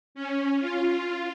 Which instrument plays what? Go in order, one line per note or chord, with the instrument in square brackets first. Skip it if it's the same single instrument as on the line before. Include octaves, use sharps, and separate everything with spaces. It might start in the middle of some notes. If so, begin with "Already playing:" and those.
[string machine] C#4
F4